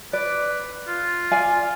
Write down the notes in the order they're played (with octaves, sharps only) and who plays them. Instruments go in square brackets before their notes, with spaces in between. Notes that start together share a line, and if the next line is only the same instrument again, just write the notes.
[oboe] B4 [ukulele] D5
[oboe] F4
[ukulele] D5 F5 G#5